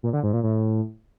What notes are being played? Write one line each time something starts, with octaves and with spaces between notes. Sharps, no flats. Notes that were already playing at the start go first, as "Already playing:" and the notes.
A#2
D3
G#2
A#2
A2